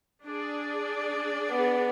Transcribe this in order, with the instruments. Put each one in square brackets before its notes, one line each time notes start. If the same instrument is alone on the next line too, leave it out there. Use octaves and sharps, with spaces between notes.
[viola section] D4 G#4 D5
[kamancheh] B3